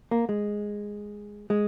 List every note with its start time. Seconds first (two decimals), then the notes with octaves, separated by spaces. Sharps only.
0.11 A#3
0.29 G#3
1.50 G#3